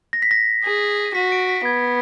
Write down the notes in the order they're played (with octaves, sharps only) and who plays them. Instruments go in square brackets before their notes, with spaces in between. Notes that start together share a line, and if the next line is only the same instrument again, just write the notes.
[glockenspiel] A#6
B6
A#6
[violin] G#4
[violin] F#4 [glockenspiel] B6
[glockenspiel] D7
B6
[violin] B3 [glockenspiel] G#6